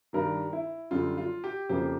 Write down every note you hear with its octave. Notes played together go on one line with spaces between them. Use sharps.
G2 D#3 G3 A#4
E4
F#2 D3 G3 F4
F4
G4
F2 C#3 F3 A#3 G4